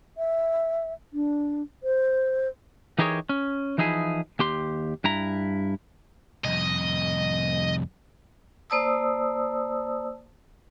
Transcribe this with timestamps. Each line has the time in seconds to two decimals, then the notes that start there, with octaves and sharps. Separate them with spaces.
0.18 E5
1.13 D4
1.83 C5
2.98 E3 D#4 G4 G#4 A#4 C#5
3.29 C#4
3.78 E3 F3 D#4 E4 G#4
4.39 D#2 G4 C6
5.04 G2 E4 A#5
6.45 C2 F2 D#5
8.70 A#3 C5 D5 A5 D#6 E6